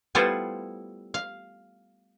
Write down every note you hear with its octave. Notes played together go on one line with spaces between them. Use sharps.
G3 A3 B3 E4 F4 C5
F5